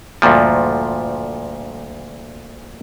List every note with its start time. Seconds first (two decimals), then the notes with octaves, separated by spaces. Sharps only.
0.22 D2 G2 A#2 F3